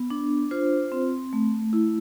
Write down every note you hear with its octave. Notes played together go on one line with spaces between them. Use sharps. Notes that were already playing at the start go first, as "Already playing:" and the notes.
Already playing: B3
D4
F4 C5
C4
A3
E4